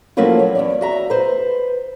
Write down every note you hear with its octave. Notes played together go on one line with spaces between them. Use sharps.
F3 F#3 A3 A#3 C#4 E4
C#5
E2 C#4 D5
F#4 E5 A#5
B4 C5